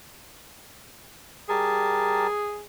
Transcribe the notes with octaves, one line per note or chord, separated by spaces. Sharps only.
G3 G#4 A#4 A5